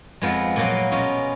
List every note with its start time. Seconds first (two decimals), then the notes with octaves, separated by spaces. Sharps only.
0.22 F2 F3 G#3 B3
0.56 A#2 F#3 A#3 F4
0.91 B2 G#3 C#4 F4